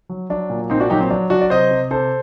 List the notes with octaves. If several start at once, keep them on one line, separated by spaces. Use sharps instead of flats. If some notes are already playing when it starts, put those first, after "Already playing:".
F#3
F#3 D4
A#2
A#2 C4 D#4
D4 F#4
F#3 D#4 G4
C4
F#3 D4
F#3 D4 F#4
D5
C3 C5 D#5
C3
C3 A4 C5